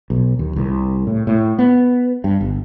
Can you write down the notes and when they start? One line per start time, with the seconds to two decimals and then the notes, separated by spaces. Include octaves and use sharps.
0.10 B1
0.39 D#2
0.56 C2
1.07 A2
1.27 A2
1.59 B3
2.24 G2
2.41 G1